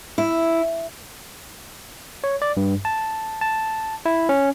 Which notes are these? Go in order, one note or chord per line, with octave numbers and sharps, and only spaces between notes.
E4
C#5
D5
G2
A5
A5
E4
C#4